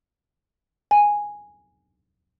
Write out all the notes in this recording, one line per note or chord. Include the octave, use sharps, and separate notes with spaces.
G#5